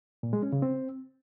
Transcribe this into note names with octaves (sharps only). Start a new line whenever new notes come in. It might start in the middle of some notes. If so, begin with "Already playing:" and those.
A#2
G#3
C#4
C#3
C4